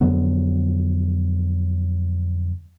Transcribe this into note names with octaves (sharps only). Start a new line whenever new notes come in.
F2 D3 F#3 B3